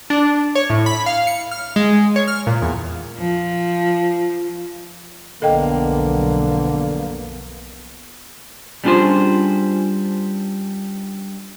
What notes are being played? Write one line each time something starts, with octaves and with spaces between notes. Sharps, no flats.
D4
C#5
A2
B5
F5
C#7
F6
G#3
C#5
F6
A#2
E2
F3
B1 F2 D3 A#3 B3 A4 D#5 G5
G3 C#4 D4 F4 G#4 C5